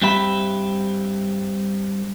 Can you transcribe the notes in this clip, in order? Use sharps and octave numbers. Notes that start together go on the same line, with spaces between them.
G2 C4 G4 E5 B5